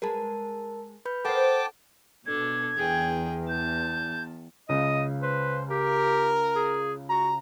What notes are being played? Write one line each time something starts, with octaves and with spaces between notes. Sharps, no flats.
G#3 G#4 A#4 B4 A5
B4 B5 G6
A4 A#4 C5 F#5 G5 A5 D6
B2 D4 A4 G#6
E2 G#4 G5
A5 G6
C#2 C#3 D#5
B4 C5
G4 A#4
G#4
F#4 A#5